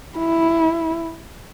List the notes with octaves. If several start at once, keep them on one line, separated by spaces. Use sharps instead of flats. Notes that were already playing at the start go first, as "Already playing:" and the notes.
E4